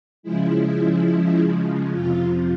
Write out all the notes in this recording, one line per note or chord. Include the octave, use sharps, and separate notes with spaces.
C#3 F3 G#3 E4
F2 C3 F3 F4